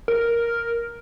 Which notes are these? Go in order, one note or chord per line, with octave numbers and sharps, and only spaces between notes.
A#4